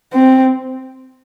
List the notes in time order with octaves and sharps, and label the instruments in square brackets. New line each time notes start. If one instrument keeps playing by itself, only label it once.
[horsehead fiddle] C4